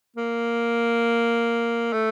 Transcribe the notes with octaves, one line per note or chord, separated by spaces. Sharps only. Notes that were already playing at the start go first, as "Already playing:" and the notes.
A#3
A3